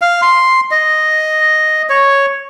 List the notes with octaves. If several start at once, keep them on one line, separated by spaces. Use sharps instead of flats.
F5
C6
D#5
C#5